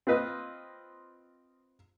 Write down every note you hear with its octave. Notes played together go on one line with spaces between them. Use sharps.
C4 F4 B4 D#5